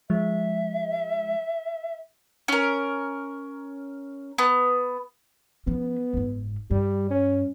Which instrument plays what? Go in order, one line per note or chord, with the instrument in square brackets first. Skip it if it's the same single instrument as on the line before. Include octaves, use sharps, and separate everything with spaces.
[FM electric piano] F3 G#3 [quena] E5
[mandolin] C#4 A#4
B3
[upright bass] F3 C#4 [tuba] B3
[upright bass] F#1 G#2
[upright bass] G2 [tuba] G3
[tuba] C#4